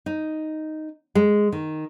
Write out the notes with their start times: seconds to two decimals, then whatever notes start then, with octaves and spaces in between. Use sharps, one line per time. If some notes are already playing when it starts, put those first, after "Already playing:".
0.06 D#4
1.15 G#3
1.52 D#3